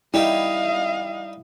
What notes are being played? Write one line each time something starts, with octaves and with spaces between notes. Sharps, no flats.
G3 D#4 E4 G4 D#5 F5